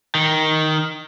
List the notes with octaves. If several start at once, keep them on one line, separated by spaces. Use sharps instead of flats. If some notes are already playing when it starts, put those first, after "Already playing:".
D#3